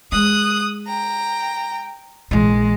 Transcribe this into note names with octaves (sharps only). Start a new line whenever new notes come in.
G#3 D#6 F#6
G5 A#5
A#1 E3 G#3